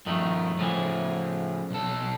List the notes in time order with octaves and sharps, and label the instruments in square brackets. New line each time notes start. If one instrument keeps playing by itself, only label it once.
[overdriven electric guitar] G2 F3 [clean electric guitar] D#3 A3
[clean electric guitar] A2 E3 [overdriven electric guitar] C#3 F3
[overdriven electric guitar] B1 A4